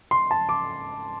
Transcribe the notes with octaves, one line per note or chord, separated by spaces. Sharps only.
C6
A5
D6